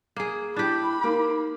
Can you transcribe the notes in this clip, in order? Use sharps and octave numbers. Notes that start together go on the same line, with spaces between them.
A#3 G#4
D4 E4 G4 B5
A#3 D#4 D6